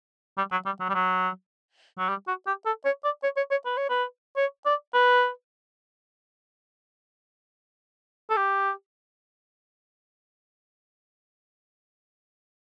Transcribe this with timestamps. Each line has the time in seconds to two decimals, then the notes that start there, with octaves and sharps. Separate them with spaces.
0.38 G3
0.52 F#3
0.66 G3
0.80 F#3
0.89 G3
0.95 F#3
1.99 F#3
2.09 G3
2.28 F#4
2.47 G4
2.66 A4
2.85 C#5
3.04 D5
3.23 C#5
3.37 C#5
3.51 C#5
3.66 B4
3.78 C#5
3.90 B4
4.37 C#5
4.66 D5
4.94 B4
8.30 A4
8.37 G4